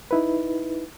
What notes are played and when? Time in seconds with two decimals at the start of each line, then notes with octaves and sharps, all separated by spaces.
0.11 D#4 E4 B4